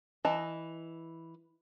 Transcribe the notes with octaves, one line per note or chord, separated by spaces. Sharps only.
E3 D#5 A5